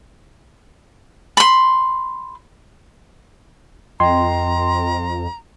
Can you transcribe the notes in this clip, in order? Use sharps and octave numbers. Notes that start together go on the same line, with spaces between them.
B5 C6
F2 D#5 G5 A#5 C6